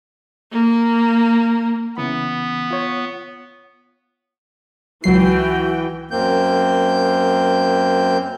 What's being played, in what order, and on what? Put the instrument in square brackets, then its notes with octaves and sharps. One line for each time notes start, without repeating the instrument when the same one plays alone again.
[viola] A#3
[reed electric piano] C#3 E3 B5 [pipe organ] B3
[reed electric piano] F4 C#5
[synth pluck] C#2 F#3 C7 [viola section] E3 G5 [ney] F#4
[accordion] F#2 A#3 C4 G6